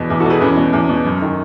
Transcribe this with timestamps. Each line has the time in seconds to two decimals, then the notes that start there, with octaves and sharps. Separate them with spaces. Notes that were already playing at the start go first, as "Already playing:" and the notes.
Already playing: E2 B2
0.10 E2
0.20 F#4 A4
0.26 B2 G#4 B4
0.41 E2 C#4
0.57 B2
0.73 E2
0.89 B2
1.05 F#2
1.22 D#3